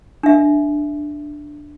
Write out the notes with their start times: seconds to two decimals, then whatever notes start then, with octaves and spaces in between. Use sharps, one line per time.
0.23 D4 E5